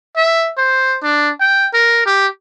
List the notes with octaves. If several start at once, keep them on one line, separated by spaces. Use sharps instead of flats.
E5
C5
D4
G5
A#4
G4